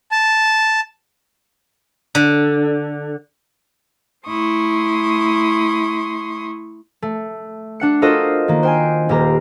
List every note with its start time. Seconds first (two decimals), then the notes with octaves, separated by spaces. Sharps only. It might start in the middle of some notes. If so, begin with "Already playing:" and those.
0.11 A5
2.15 D3
4.26 A3 E4 C6 C#6 D#6
7.02 A3
7.80 D4 F#5 C#7
8.02 F4 F#4 A4 A#4 C5 D#5
8.48 D#3 A#3
8.63 C5 G5 G#5
9.09 D#1 A#3 G4 A#5